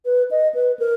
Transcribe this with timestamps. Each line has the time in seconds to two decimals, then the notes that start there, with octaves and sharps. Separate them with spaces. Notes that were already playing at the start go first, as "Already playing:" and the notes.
0.05 B4
0.31 D#5
0.55 B4
0.79 A#4